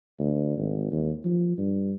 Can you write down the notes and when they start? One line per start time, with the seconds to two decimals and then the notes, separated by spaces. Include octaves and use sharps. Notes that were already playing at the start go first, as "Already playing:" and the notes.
0.19 D2
0.57 G#1
0.92 D#2
1.25 F3
1.58 G2